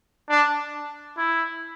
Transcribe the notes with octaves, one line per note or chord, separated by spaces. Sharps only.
D4
E4